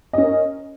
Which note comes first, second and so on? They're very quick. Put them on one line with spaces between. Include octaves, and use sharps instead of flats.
D#5 C#4 A#4